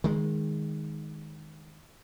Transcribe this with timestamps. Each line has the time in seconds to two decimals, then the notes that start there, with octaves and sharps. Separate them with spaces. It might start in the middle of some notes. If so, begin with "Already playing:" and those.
0.04 D#3 G#3